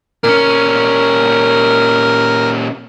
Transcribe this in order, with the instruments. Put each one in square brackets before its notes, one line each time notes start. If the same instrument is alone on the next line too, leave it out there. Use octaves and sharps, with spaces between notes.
[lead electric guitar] A#2 C#4 [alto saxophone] A#4